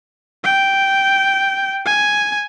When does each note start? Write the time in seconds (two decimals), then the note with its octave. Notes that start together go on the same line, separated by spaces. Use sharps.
0.44 G5
1.86 G#5